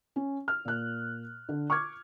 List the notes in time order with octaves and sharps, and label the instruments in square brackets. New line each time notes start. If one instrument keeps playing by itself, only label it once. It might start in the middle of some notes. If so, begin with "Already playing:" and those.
[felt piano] C#4
F6
A#2 F#6
D3
C#6 D6 F6 G#6